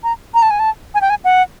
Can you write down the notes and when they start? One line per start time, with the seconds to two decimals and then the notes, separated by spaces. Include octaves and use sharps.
0.04 A#5
0.34 A#5
0.42 A5
0.51 G#5
0.59 A5
0.95 G#5
1.01 G5
1.10 G#5
1.24 F#5